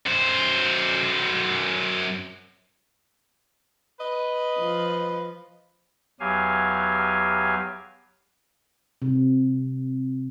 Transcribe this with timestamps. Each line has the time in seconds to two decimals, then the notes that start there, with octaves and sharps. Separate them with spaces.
0.06 F#2 C5
4.00 B4 D#5
4.59 F3
6.20 E2 F#3 G4 F5 G#5
9.02 C3